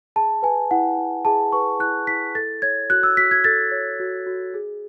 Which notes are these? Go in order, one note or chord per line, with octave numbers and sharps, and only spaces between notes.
G#4 A5
B4 G#5
E4 F#5
E4
G#4 A5
B4 C#6
E4 F#6
E4 B6
A4 A6
C#5 G#6
F#4 F#6
E6
F#4 B6
G#6
A4 A6
C#5
F#4
F#4
G#4